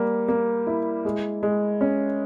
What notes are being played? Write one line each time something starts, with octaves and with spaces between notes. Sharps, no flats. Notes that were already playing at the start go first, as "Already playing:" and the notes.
Already playing: G3 A#3
A#3
E4
G#3
G#3
C#4